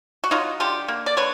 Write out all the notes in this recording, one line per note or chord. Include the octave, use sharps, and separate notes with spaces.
F#4
F#3 D#4 F4
D3 F4 G4
A#3
D5
D3 B4 C#5